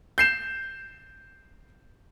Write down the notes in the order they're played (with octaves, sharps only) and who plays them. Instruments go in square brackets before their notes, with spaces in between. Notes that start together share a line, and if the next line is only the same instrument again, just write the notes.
[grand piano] G6 C7 E7